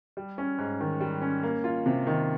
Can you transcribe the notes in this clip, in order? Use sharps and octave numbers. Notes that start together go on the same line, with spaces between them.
G3
C#4
G#2
D#3
G3
C#4
A#3
F4
C3
D#3